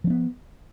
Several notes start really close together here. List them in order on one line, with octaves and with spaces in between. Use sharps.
F3 C4 B3